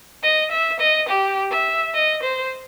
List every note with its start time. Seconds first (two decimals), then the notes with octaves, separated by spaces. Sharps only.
0.23 D#5
0.51 E5
0.80 D#5
1.09 G4
1.51 E5
1.94 D#5
2.23 C5